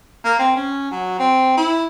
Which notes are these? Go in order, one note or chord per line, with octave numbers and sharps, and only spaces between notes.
A#3
C4
C#4
F#3
C4
E4